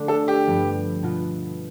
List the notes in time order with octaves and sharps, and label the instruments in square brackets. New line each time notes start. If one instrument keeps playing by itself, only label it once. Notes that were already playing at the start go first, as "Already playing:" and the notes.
Already playing: [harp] D3 A3 D4
[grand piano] A4
G4
[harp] G2 F3 B3
B2 B3 F4